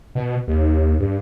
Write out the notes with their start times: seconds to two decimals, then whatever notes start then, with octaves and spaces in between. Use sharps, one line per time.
0.15 B2
0.48 D#2
1.00 G2